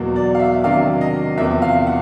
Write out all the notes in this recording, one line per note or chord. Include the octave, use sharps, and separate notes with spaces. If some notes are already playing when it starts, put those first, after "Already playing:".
Already playing: E2 B2 F#3 A#3
D5
F5
E5
C3 D#3 F#3 A#3 D4 F5
D#5
E2 C3 F3 A#3 E5
F5
F#5